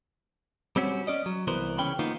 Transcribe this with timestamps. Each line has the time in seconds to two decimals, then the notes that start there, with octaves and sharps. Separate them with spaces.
0.76 G3 C4 C#4 F#4
1.07 C#4 D5 D#5
1.26 F#3
1.47 C2 E3 B3 A#4 C5
1.78 C#3 E3 C#4 G5 B5
1.99 D#3 F3 A#3 B3 D#4 F4